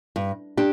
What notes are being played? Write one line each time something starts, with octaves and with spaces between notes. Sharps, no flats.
G2
D4 G4